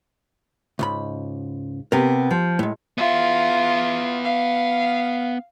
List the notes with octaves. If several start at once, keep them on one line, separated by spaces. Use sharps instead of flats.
C#2 G#2 B5
C3 B3 A#4
F3
A2 G#3
B3 F4 E5
F5